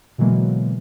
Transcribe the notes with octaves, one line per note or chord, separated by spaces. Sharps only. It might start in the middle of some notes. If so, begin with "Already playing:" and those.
B2 D3 E3 F#3 G#3 A#3